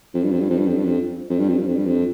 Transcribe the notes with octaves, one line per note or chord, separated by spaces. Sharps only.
F2
G2
F2
G2
F2
G2
F2
G2
F2
F2
G2
F2
G2
F2
G2
F2